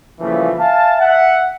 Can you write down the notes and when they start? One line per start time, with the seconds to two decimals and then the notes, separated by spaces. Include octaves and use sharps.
0.20 A#2 C#3 E3 F3 G3 A3
0.59 E5 F5 G#5 A5
0.99 E5 F#5